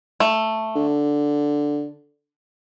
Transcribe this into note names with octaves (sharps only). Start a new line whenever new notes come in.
A3
D3